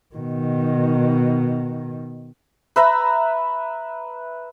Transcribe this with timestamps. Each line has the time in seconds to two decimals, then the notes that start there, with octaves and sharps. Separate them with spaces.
0.15 B2 D#3
2.76 B4 E5 A#5 B5